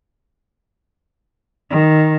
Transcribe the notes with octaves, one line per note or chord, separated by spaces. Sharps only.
D#3